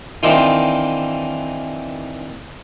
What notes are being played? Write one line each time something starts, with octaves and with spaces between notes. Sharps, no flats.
D#3 E3 C4 D4 D#4 F4